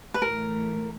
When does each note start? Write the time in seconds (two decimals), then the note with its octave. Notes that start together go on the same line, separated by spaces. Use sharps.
0.14 B4
0.22 A2 E3 A3 A#4